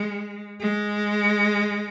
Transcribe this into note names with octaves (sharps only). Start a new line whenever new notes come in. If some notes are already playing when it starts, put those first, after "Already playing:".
Already playing: G#3
G#3